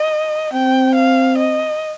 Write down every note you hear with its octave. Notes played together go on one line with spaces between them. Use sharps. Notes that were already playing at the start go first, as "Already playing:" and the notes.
Already playing: D#5
C4 G5
F5
D#5